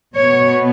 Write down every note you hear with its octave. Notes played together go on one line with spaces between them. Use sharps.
B2 B3 C#5